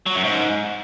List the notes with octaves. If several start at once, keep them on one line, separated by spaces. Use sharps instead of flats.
F#3
F#2
G#2